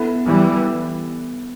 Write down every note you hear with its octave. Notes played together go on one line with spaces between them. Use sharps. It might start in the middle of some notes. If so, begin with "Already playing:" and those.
Already playing: B3 E4 A4
E3 G3